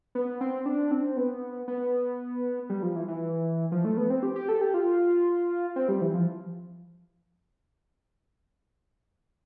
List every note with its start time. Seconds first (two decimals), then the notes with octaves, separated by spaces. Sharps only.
0.15 B3
0.41 C4
0.66 D4
0.91 C4
1.17 B3
1.68 B3
2.70 G3
2.83 F3
2.96 E3
3.08 E3
3.72 F3
3.85 A3
3.97 B3
4.10 C4
4.23 G4
4.36 G4
4.49 A4
4.61 G4
4.74 F4
5.76 C4
5.88 G3
6.01 E3
6.14 F3